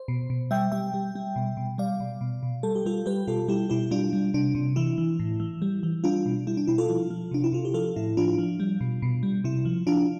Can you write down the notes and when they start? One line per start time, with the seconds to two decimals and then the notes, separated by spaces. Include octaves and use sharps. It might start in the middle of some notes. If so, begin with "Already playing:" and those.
Already playing: C5
0.08 B2
0.30 B2
0.51 G3 E5 G5
0.72 G3 E5 G5
0.94 G3
1.15 G3
1.36 B2
1.57 B2
1.78 G3 D5 F5
2.00 B2
2.21 B2
2.43 B2
2.63 G3 A4
2.75 G4
2.85 G3 F4 A4
3.06 G3 G4 B4
3.27 B2 F4 A4
3.48 G3 E4 G4
3.70 B2 E4 G4
3.91 G3 D4 F4
4.13 G3
4.34 C3 D4
4.55 C3
4.76 E3 E4
4.98 E3
5.20 A2
5.40 E3
5.62 G3
5.83 E3
6.04 G3 D4 F4
6.26 B2
6.47 G3 E4
6.57 D4
6.67 B2 E4
6.78 F4 A4
6.89 F3
7.10 F3
7.31 C3 D4
7.44 E4
7.53 C3 F4
7.65 G4
7.74 F3 F4 A4
7.96 A2 E4
8.17 F3 D4 F4
8.38 F3
8.60 G3
8.81 B2
9.02 B2
9.23 G3
9.44 C3 E4
9.65 F3
9.87 F3 D4 F4